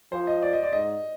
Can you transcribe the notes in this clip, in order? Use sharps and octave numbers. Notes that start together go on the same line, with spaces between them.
F3 C5
D#5
D5
D#5
D5
G#2 D#5